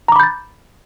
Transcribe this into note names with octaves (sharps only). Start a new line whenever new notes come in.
A#5 B5 D6 G6 A6